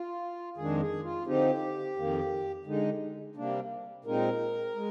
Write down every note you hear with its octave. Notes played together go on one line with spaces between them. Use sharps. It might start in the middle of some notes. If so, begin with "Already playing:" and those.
Already playing: F4
F2 D#3 G#3 D4 G#4
G#4
F4
D3 F3 C4 D#4 G4
F2 D#3 A#3
D3 G#3 D#4
C3 G3 A#3 D4
A#2 G#3 C4 D#4 A#4
G#3